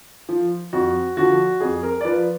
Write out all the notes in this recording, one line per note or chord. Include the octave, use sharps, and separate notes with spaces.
F3
F2 F#4
D3 F3 F#4
F2 G#4
A#4
D5
F3 B4